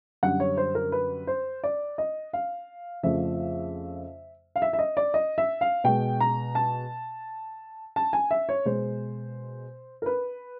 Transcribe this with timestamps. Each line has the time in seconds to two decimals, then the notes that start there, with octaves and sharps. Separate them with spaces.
0.23 F#2 D3 G3 F#5
0.40 C#5
0.57 C5
0.75 A#4
0.92 B4
1.27 C5
1.64 D5
1.98 D#5
2.33 F5
3.03 F2 C#3 F3 A3 E5
4.56 F5
4.62 E5
4.73 E5
4.79 D#5
4.97 D5
5.14 D#5
5.38 E5
5.61 F5
5.84 B2 G#3 G5
6.20 A#5
6.55 A5
7.96 A5
8.13 G#5
8.31 E5
8.49 C#5
8.65 B2 G#3 C5
10.02 A#4
10.06 B4